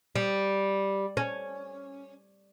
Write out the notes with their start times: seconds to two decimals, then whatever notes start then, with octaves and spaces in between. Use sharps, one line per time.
0.16 G3
1.17 C#4